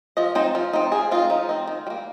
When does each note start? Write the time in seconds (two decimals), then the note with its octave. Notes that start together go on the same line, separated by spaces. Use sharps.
0.17 F3 D#5
0.35 C4 D#4 C5
0.55 F3
0.73 C4 D#4
0.92 F3 G#4
1.11 C4 D#4 F4
1.30 F3 D#4
1.49 C4 D#4
1.67 D#3
1.87 G3
1.90 A#3